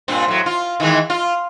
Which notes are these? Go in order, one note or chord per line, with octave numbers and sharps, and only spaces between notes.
G2 A#2 C4
A2 F#3
F4
D#3 E3 G#3
F4